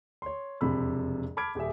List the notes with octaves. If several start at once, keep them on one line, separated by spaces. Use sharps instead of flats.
C#5 C6
E1 F2 C3 B5 E6
A5 B5 D6 F6 G#6 D7
D#1 G4 G#4 E5